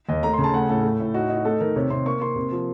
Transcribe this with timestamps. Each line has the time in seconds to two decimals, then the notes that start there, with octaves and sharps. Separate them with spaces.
0.09 D#2 D#5
0.23 A3 A#5
0.34 C6
0.38 C#3
0.44 A5
0.54 A3 F#5
0.69 A2 A4
0.84 A3
1.00 A2
1.14 D#4 F#4
1.29 D#4
1.36 F#4
1.45 A3 A4
1.60 D#3 A#4
1.76 C3 C#5
1.90 C3 C6
2.06 A#3 C#6
2.21 A#3 C6
2.36 C3
2.51 F3